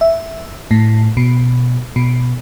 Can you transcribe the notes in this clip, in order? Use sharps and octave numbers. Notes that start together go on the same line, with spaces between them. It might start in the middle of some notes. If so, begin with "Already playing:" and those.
E5
A2
B2
B2